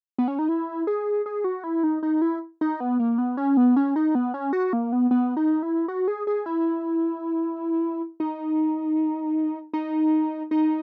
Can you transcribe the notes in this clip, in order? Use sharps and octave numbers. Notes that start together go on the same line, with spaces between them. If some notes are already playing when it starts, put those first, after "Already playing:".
B3
C#4
D#4
E4
G#4
G#4
F#4
E4
D#4
D#4
E4
D#4
B3
A#3
B3
C#4
B3
C#4
D#4
B3
C#4
F#4
A#3
B3
B3
D#4
E4
F#4
G#4
G#4
E4
D#4
D#4
D#4